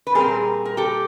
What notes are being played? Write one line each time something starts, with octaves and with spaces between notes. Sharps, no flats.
B4
A#2 G3 C4 G#4 A#4
A#4
G4 A4